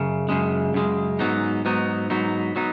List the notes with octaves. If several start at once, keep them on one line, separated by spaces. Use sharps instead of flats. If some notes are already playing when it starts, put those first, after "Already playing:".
Already playing: F#2 C#3
F#2 C#3 G#3
F#2 C#3 G#3
G#2 F#3 B3 D#4
G#2 F#3 B3 D#4
G#2 F#3 B3 D#4
F#3 B3 D#4